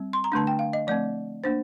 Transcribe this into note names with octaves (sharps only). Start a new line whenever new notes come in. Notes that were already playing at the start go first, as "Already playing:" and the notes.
Already playing: G3 C4
C6
A#5
D3 A3 D4 A5
G5
F5
D#5
F3 A3 C4 D5
A#3 D4 C5